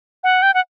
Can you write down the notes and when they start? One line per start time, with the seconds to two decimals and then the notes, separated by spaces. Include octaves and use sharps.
0.24 F#5
0.42 G5
0.54 F#5